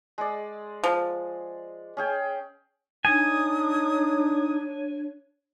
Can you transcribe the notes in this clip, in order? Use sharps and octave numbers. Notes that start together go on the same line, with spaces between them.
G#3 D5
F3
C#4 G#4 G5
D4 D#4 C#5 G#5 D#6